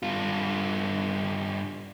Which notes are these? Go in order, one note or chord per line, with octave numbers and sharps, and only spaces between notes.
G2 F4